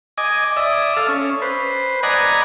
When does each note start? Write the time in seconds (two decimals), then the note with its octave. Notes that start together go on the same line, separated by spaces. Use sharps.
0.18 D#5 G#5 D6
0.56 D5 E5 D#6
0.96 A4 F5
1.08 C#4
1.42 B4 C5
2.03 D5 D#5 F#5 G#5 A#5 B5